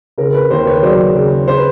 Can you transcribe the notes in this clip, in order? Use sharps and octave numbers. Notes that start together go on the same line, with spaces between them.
C#3 A#4
B4
D#2 A#4 C5
B4 C#5
F#3 C5 D5
C#3
C5
B4